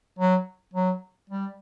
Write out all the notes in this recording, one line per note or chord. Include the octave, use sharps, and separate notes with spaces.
F#3
F#3
G3